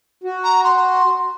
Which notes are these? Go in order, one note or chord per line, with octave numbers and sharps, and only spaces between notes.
F#4
A#5
C6